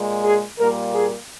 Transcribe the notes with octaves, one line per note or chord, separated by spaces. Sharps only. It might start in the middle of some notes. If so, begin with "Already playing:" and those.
Already playing: A#2 G#3
G#4
A#2 G3 A#3 A#4
G#4